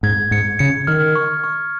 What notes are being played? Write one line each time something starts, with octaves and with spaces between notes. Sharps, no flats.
G#2 G#6
G#2 C#7
C#3 C#7
D#3 F6
C#6
C#6